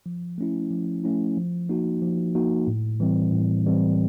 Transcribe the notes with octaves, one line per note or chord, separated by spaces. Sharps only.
F3
A3 C#4 E4
F3
A3 C#4 E4
F3
A#3 D#4 F#4
F3
A#3 D#4 F#4
A2
E3 G3 C4
A2
E3 G3 C4